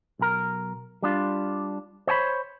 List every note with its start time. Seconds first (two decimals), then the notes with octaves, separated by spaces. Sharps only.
0.19 B1 A#4
1.02 G3 D4 F4
2.07 C5 C#5 G#5 B5